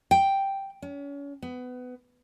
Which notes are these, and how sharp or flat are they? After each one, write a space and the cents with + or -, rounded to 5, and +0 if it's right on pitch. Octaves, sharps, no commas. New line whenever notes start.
G5 +0
C#4 +35
B3 +20